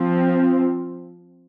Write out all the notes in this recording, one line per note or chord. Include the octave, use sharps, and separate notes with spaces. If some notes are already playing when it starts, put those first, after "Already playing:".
Already playing: F3 C4